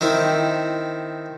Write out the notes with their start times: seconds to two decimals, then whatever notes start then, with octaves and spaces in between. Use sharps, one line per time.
0.01 D#3 C4 E4